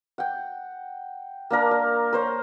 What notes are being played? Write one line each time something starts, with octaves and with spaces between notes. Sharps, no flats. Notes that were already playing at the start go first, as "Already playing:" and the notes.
F#5 G5
A#3 D4 A#4 A#5
D5
A#4 C5 C#5